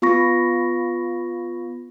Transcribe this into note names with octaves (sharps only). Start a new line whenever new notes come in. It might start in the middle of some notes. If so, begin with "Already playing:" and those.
B3 F4 B5 C#6 A#6